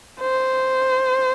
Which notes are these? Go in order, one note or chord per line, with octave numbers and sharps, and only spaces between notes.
C5